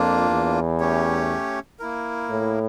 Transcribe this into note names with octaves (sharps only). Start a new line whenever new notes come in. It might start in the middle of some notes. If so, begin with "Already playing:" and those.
Already playing: F2 A#3 D4 F4
E2
A3 C#4 G4 C#5
A#3 E4 A#4
A2